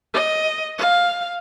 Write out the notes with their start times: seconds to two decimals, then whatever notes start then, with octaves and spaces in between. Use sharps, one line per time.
0.14 D#5
0.78 F5